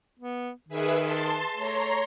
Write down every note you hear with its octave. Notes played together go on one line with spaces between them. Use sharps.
B3
D#3 G#4 B4 E5
A5 C6
A3 C#5 A#5 C6